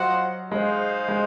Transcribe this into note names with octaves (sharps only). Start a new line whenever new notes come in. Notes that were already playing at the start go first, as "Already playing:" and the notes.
Already playing: F#3 F4 C5 D#5 F#5
G#3 D#4 G#4 C5 F5
G#3